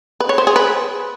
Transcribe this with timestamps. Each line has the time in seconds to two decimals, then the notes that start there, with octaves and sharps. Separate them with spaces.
0.20 B4
0.29 C#5
0.38 C5
0.47 G#4
0.56 B4